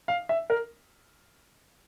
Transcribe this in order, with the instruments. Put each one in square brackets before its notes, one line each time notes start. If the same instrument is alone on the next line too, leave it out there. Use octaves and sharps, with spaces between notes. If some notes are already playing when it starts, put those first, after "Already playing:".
[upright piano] F5
E5
A#4